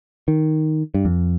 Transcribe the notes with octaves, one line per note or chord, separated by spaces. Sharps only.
D#3
G2
F2